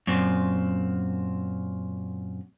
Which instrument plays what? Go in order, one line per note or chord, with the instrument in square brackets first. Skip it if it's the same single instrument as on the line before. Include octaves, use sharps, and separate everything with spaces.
[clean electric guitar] F#2 A#2 C4